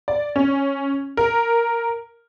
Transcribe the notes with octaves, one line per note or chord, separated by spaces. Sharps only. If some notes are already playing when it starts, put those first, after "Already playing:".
D5
C#4
A#4